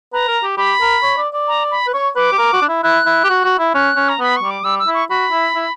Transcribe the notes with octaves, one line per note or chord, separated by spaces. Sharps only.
B4 A#5
A#4
G4
G4 B5
A#4
C#5
D5
D5
A#5
B5
B4
C#5 C#6
B4 D6
G4
A#4
F#4
D4
E4
E4 F#6
E4
G4
F#4
F#4
E4
C#4 F#6
C#4
A#5
B3 B5
C#6
G3
D6
G3 E6
E6
E4
C#6
F#4 B5
E4
E4